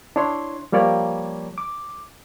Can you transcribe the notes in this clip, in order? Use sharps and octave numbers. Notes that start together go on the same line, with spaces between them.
D4 E4 C#5 C6
F3 G3 A#3 C#5 D5
D6